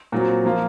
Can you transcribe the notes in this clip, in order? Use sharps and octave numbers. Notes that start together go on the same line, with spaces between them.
A#2 F#3 C4
F3 A#3 F4